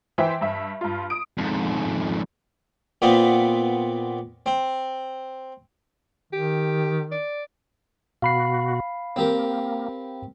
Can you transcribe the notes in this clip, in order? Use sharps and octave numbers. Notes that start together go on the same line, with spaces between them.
E3 C5 E5 G5
G2 E5
G2 F4
D#6 D7
F2 G#2
A#2 B3 C4
C4
D#3 G4
D5
B2 F#4 F5 B5 C7
A#3 C4 G4 A#4